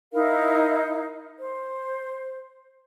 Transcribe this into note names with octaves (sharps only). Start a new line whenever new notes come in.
D#4 E4 A#4 F5
C5